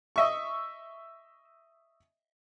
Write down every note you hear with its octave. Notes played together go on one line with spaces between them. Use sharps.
D#5 E5 C#6